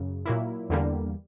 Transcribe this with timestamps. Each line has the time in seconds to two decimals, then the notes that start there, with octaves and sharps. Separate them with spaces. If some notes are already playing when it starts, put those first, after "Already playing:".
Already playing: F#2 C#3
0.25 A#2 F#3 A#3 E4
0.70 E2 D3 G3 A#3